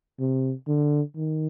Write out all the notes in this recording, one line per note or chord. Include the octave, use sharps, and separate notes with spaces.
C3
D3
D#3